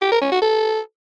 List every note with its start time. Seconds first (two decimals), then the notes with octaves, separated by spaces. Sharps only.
0.02 G4
0.12 A#4
0.22 C#4
0.32 F#4
0.42 A4